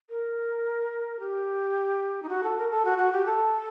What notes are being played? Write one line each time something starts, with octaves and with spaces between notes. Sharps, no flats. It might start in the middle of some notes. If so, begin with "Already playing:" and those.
A#4
G4
D#4
F#4
A4
A#4
A4
F#4
F#4
G4
A4